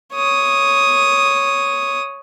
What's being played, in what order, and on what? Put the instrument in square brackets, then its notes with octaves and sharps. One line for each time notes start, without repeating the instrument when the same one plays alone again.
[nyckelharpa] C#5 D#6